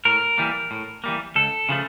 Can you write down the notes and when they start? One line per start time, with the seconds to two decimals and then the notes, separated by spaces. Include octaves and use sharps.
0.05 A2 A#4
0.38 E3 G3 A#3
0.71 A2
1.04 E3 G3 A#3
1.35 C#2 A4
1.69 C#3 F3 A3